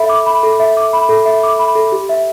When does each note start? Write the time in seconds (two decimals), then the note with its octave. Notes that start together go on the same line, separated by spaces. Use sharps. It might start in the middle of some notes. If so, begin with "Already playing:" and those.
Already playing: A4 E5 B5
0.09 D6
0.26 B5
0.43 A4
0.60 E5
0.77 D6
0.93 B5
1.09 A4
1.26 E5
1.43 D6
1.59 B5
1.75 A4
1.92 G4
2.09 E5